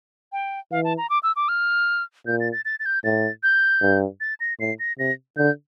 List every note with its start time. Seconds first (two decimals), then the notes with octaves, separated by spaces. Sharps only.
0.32 G5
0.72 E3 F5
0.84 A5
0.98 A#5
1.10 D6
1.23 E6
1.36 D6
1.49 F6
2.27 A#2 G6
2.40 A6
2.52 A6
2.65 A6
2.80 A6
2.86 G6
3.04 A2 A6
3.43 G6
3.82 G2
4.21 A6
4.40 A#6
4.60 A2 C7
4.79 A#6
4.99 C3 A#6
5.37 D3 G6